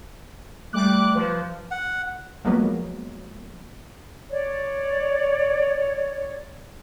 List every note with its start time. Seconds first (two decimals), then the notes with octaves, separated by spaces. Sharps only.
0.73 G3 A3 D6 F#6
1.15 F3 B4
1.71 F#5
2.45 F3 F#3 G#3 A#3 B3
4.31 C#5 D5